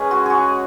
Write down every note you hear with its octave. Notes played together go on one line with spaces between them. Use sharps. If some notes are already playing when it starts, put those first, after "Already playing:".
Already playing: C#3 G#3 C#4 G#4 B4
F#4
F#4 G#4